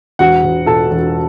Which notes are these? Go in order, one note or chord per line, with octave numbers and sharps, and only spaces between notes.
E1 F#4 F#5
E1
B2 A4 A5
E1